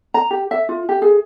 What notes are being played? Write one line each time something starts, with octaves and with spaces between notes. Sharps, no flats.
A#5
G4
E5
F4
G4
G#4